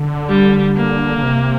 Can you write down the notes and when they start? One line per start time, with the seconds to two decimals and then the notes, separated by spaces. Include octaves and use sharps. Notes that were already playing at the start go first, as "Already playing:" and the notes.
Already playing: D3
0.29 G3
0.76 A#3
1.18 D3
1.23 C3